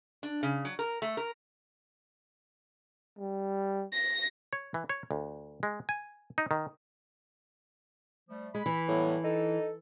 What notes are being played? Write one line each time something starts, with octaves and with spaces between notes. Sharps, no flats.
D4
C#3
F#3
A#4
A3
A#4
G3
A#6
C#5
E3
C#5
D2
G#3
G#5
D#4
D#3
F3 G3 A3
G#3 B5
E3
A2 F#3 G3 B3
D#4 A4